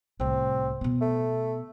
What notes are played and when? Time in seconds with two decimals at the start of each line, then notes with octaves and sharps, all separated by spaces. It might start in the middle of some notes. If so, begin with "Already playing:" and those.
0.20 C2 A2 C4
0.81 B2 B3
1.01 A3